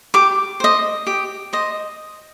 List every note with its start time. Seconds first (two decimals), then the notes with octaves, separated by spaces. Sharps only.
0.14 G4 D6
0.60 C5 D#5
1.07 G4
1.53 C5 D#5